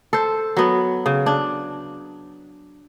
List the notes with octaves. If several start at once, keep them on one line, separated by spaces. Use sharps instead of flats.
A4 C5
F#3 B3
C#3
D4